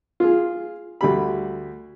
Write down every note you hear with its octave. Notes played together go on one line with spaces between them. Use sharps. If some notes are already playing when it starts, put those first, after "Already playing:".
F4 G#4
D2 G3 B5